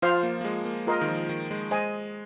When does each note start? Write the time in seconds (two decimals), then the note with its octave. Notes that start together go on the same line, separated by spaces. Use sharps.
0.02 F3 F4 C5 F5 C6
0.23 A#3
0.41 A#3
0.45 G#3
0.65 A#3
0.87 G#3 F4 A#4 D#5 C6
1.01 D#3
1.08 F3
1.29 D#3
1.51 G#3
1.71 G#3 C5 D#5 G#5